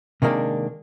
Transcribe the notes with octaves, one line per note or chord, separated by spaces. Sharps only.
C3 D#3 G#3 A#3 D4